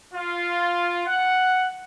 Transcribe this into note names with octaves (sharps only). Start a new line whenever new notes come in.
F4
F#5